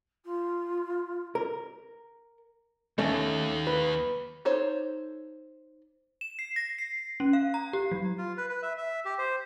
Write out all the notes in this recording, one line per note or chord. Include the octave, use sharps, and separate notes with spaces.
F4
A#4
D#2 A3 C#4
B4
D#4 A4 C5 C#5
E7
C7
A#6
C7
C#4
F5
A#5
G4
F#3
F4
B4
B4
E5
E5
G4
C5